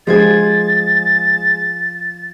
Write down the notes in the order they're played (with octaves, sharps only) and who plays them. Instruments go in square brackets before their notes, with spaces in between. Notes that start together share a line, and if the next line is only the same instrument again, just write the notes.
[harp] F3 C5 G#6 [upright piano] G#3 G#4 [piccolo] A6